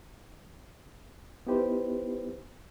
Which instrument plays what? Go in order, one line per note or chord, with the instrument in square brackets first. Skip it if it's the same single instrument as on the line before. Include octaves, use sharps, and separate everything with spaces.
[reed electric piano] B3 D#4 E4 G4 B4 C5